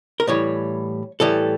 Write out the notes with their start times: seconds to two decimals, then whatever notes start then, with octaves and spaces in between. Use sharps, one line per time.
0.20 A#4
0.27 A2 E3 G3 C#5
1.20 A2 E3 G3 A4